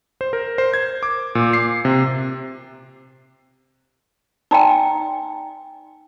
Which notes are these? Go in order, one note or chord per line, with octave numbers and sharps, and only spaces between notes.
C5
A#4
C5
G#6
D6
A#2
C7
C3
D#4 D5 G5 G#5 A#5 C6